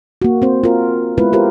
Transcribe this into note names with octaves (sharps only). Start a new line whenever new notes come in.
A#3 F#4
C4 C5
F4 A#4
G#3 B3 E4 F4 B4
F4 G4 A#4 C5